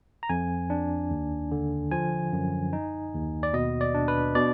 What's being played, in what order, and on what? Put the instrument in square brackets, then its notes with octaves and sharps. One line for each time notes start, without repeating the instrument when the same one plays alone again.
[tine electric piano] A#5
F2 G#5
D4
D#2
D3
F3 G#5
F#2
D#4
D#2
D5
B2 D#5
D5
D4
B4
B2 D5